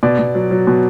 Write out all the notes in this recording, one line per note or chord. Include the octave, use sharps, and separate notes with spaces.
B2 D5
B2
F#3
F#3
B2